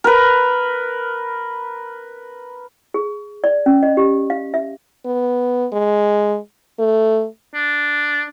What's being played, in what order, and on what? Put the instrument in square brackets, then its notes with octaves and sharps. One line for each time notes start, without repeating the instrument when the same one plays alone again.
[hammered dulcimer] A#4 B4
[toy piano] G#4
D5
C#4
D#5
G4
F5
E5
[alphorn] B3
G#3
A3
[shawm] D4